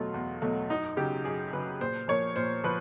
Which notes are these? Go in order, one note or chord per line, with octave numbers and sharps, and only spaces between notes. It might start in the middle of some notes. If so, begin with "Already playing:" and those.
Already playing: E2 B2 F#3 A3 F4
E2
B2 F#3 A3
F#2 D#4
C#3 F#3 G4
F#2 G#4
C#3 F#3 B4
A#2 C5
F3 A#3 C#5
A#2 C5
F3 B4